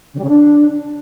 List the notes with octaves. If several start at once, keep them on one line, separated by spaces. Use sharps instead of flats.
C#3
G3
C#3
D4